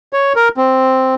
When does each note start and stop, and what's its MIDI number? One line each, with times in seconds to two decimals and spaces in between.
0.13 0.33 73
0.36 0.49 70
0.57 1.15 60